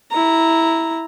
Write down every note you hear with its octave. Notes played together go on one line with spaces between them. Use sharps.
E4 A#5